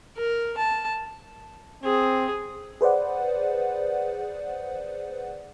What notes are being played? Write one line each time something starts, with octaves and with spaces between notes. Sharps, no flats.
A#4
A5
C4 G#4
G#4 B4 C5 D5 F#5